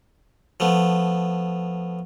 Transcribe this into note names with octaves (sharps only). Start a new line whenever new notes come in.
F3 A3 B3